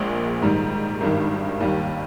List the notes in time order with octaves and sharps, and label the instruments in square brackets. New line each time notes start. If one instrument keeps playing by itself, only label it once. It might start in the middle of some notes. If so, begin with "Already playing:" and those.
Already playing: [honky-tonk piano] A#1 A#2 G#3
G#2 D#3 G3
G#1 G2 D#3
D#2 D#3 G3